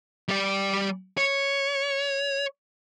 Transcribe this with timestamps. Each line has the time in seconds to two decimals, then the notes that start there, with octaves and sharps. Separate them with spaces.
0.28 G3 D5
1.18 C#5